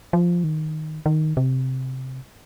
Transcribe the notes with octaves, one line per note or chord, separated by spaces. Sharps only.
F3
D#3
D#3
C3